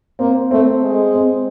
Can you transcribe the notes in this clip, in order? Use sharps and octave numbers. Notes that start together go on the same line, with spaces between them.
A#3 C4
A3 C4
G#3
C4